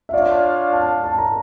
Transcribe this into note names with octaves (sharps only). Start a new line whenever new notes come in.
E5
D4 F4 C#5 D5 F5
A5
A5
A#5